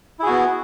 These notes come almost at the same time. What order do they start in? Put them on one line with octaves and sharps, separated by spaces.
E4 G#4 F#4 B3